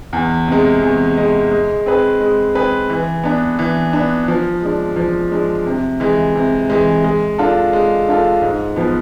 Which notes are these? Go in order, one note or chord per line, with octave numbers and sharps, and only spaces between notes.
E2
C3 G#3
E2
C3 G#3
G#3
C4 G#4 B4
G#3
C4 G#4 B4
E3
B3 D4
E3
B3 D4
F3
G#3 D4
F3
G#3 D4
C3
E3 G#3
C3
E3 G#3
G#3
D4 F4 A4
G#3
D4 F4 A4
G#2
F3 B3